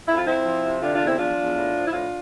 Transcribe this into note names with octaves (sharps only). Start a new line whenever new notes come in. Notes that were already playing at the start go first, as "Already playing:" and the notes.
F2 E4
F4
F3 C4 E4
F3
C3
D3 D4 F4
D4 F4
E2
C4 E4
F3 D4 F4
E2
A2
F3
E4
A2 D4 F4